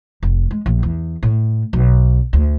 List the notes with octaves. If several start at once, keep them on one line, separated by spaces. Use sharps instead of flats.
F1
G#3
A#1
E2
A2
B1
D2